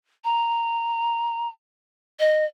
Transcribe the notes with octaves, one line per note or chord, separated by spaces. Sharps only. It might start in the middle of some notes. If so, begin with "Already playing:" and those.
A#5
D#5